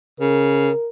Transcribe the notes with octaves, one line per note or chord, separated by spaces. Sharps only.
C#3 A#4